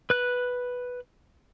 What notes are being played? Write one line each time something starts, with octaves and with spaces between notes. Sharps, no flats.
B4 F#6